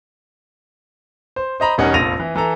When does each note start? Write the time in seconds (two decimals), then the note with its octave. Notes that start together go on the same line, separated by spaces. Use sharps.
1.36 C5
1.60 C5 D#5 A#5 B5
1.78 E1 G3 C#4 D#4 A#4 F#5
1.94 F1 A#1 F4 A#6 D#7 F7
2.20 E3
2.36 E3 A4 A#5